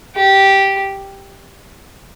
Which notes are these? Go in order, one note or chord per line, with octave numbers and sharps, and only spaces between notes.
G4